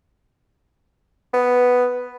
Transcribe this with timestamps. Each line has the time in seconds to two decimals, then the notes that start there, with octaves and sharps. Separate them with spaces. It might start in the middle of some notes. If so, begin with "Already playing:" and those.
1.33 B3